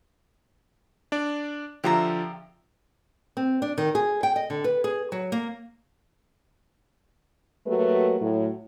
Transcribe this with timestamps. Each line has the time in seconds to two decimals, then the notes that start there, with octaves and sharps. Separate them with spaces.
1.12 D4 D5
1.84 D3 F3 F4 G4 E5 A#5
3.37 C4
3.62 D4
3.78 D#3
3.95 G#4
4.23 G5
4.36 D#5
4.50 D3
4.64 B4
4.84 G#4
5.12 F#3
5.32 A#3
7.67 F#3 A3 A#3 F#4 G4 B4
8.21 A2 F#3